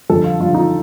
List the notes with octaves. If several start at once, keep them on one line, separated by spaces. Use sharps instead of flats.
F2 D3 G3 A4
F4
F2 D3 G3 F4
D#4